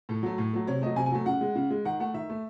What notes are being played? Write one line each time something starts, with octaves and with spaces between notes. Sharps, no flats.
A2 A4
F#3 A3
A2
F#3 A3
C3 C#5
F#3 A3 D#5
C3 G#5
G#5
F#3 A3
C#3 F#5
G#3
C#3
G#3
D#3 F#5
A3 F#5
D#3 E5
A3